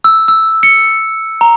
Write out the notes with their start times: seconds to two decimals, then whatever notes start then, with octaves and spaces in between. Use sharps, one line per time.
0.04 E6
0.28 E6
0.63 C#7
1.41 A#5